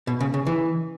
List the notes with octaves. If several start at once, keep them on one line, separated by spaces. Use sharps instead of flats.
B2
C#3
C#3
E3